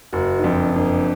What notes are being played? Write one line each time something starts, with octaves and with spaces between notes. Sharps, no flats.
F#1 F#4
D#4
F2 D4
F#1 D4